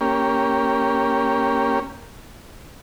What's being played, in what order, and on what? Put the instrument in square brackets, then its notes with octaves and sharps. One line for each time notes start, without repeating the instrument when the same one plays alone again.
[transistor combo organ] A#3 C#4 G4